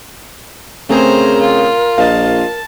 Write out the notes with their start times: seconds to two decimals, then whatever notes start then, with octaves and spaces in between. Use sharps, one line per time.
0.89 C#3 A3 C4 G#4 A#4 C5 A#5
1.40 F4
1.98 A#1 F4 D#5 F5 A5